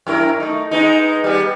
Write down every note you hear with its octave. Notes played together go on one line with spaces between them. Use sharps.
F#2 E4 A#4
A3 D#4
G#3 B3 D#4
G3 B3